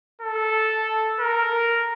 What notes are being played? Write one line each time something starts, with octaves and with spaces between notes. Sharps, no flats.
A4
A#4